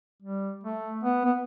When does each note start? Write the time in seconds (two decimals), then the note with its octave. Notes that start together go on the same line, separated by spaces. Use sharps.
0.23 G3
0.64 A3
1.04 B3
1.25 B3